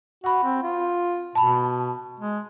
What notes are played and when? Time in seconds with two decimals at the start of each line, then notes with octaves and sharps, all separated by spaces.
0.24 F#4 F#5 B5
0.44 C4
0.63 F4
1.35 B2 A5 B5
2.20 G#3